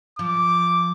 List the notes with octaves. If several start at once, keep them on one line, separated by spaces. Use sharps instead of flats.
F3 D6